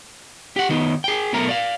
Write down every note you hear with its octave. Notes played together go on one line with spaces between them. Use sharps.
G4 F#5
D#3 B3 D#4
G#4 G5
B1 B2 A3 A#4 A#5
D5 F5